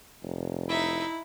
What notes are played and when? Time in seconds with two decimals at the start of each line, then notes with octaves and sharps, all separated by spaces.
0.23 F1
0.69 D#4 E4 E5